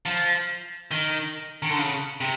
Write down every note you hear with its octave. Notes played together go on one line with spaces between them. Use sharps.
F3
D#3
D#3
D3
C#3
C3